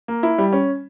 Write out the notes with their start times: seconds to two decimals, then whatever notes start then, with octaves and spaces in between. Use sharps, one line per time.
0.08 A#3
0.23 E4
0.38 G3
0.53 C#4